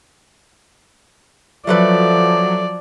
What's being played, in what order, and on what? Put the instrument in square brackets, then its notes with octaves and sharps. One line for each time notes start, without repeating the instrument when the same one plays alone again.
[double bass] F3 [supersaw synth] F#3 [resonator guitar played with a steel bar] A3 A4 B4 [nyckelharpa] D5